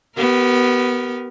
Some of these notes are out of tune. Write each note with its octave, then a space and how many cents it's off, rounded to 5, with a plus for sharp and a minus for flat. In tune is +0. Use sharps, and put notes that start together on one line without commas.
B3 +0 G4 -40 A#4 +0